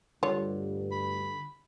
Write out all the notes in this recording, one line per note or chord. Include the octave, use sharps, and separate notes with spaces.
D2 G2 D3 F4 C#5
B5